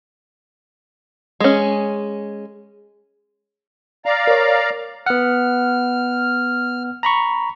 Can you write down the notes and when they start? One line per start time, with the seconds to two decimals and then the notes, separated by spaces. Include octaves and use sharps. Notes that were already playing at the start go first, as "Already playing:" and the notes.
1.40 G#3 C#4
4.06 D5 F5 A#5
4.27 A#4 C#5
5.06 B3 F#5 F6
7.03 A#5 B5 C#6